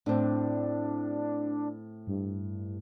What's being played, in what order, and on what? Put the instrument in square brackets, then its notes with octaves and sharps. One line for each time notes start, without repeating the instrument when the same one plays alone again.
[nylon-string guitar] A2 C4 [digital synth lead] D4
[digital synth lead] G2